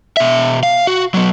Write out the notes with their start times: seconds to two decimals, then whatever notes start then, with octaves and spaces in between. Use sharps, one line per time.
0.17 B2 E5
0.63 F5
0.87 F#4
1.14 F#3 B3